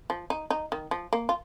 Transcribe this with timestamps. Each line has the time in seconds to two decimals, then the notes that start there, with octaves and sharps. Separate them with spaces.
0.10 F3
0.30 D#4
0.50 D#4
0.72 D#3
0.91 F3
1.13 A#3
1.29 F4